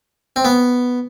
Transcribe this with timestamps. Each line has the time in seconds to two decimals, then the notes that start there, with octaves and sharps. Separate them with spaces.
0.36 C4
0.45 B3